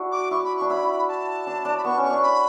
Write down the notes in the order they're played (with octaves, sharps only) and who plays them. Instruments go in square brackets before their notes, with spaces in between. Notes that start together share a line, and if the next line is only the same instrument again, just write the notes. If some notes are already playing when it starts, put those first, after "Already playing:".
Already playing: [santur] D4 E4 F#4
[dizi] D6
[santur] E4 [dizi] C#6
[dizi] B5
[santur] D4 [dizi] C#6
[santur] E4 [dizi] B5
[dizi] A5
[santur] D4
D4
[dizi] B5
[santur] B3 [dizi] C#6
[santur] C#4
[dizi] C#6
[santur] D4
[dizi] B5